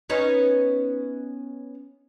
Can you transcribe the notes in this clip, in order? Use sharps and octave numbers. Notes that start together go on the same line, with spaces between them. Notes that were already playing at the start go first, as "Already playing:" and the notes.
B3 C#4 D#4